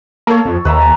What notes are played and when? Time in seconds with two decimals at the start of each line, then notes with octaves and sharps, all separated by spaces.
0.27 A#3 A4 C#5
0.45 F2
0.65 D#2 B4 E5 A#5
0.81 G#5